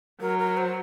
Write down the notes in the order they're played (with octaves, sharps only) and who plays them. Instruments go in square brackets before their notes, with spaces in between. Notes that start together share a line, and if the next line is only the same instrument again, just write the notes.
[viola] F#3 [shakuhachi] A#4
[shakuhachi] A#4
C5